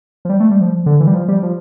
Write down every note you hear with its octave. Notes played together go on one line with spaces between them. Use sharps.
F3
G3
A3
G3
F3
D3
E3
G3
F3
G3
F3